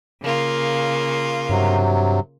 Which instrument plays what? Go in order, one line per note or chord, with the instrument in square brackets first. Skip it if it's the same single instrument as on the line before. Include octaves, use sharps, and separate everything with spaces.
[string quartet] C#3 A#3 F4
[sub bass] G2 [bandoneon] C3 F#3